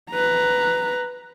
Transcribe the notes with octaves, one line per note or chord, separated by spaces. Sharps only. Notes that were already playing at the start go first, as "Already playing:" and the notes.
B4 A#5